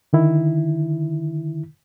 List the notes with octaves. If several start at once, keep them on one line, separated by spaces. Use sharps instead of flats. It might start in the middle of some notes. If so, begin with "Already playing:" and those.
D3 D#3 E4